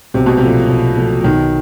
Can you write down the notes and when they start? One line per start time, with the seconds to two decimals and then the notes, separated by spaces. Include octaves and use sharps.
0.14 B1 C3
0.26 B2
0.37 C3
0.42 A#2 F3 A3
0.70 B1
0.97 A#2 F3 A3
1.24 B1 D#3